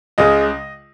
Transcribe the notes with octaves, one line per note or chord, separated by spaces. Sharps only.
C#2 C#3 G#3 D#5